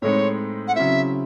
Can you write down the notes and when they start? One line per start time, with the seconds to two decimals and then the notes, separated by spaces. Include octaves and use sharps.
0.02 A2 G#3 C4 D#4 C#5
0.68 F#5
0.75 C#3 F#3 C4 E4 E5